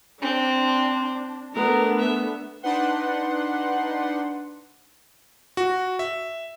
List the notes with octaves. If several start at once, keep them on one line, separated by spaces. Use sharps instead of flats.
C4 D4 C5
A3 B3 D4 A#4
E5
D4 D#4 B4 F#5 C6
F#4
E5